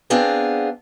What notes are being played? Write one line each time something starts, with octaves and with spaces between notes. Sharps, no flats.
B3 C4 D4 G#4 F5